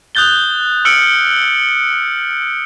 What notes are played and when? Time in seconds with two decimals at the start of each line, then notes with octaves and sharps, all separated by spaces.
0.15 D#6 F#6 G6 A6 G7
0.85 E6 F6 C#7 D7 F#7